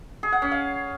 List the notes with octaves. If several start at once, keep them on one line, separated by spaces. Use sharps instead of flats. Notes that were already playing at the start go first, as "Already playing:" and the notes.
G#4
F#5
C#4
F5